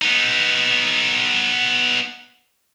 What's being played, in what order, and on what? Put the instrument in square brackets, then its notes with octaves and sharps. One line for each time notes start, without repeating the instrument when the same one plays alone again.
[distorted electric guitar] B3 D#4